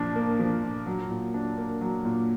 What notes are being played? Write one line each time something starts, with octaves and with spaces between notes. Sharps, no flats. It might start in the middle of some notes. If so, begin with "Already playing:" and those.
Already playing: A#2 F3 D4
A#3
F3
A#2
F#3
A#2
D4
A#3
F#3
A#2